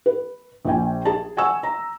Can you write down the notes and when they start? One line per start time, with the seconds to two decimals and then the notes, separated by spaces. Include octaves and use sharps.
0.06 B4
0.65 A#1 F3 G5 G#5
1.05 G#4 A5
1.37 F#5 G#5 C#6 E6
1.63 A#5